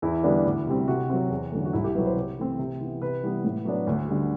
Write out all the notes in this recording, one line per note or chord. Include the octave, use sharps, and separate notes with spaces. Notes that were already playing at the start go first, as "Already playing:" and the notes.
E2 E4
D3 G3 B3 D4
D2
C3 G3 C4
C3 F#4
F#3 C4
E2
D3 F#3 A3
F#4
C2 E4
G4
B2 F#3 B4
C5
C3
E3 A3 C4
C3
E3 B3
C3 B4
E3 G3 B3
A2
F#3 B3 D4
D2
D3 G3